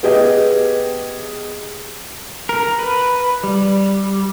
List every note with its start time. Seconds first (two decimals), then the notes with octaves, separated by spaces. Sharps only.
0.03 B3 G4 G#4 D#5
2.49 A#4
2.79 B4
3.44 G3